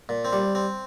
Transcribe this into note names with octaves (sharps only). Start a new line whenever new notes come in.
A#2
C4
G3
C4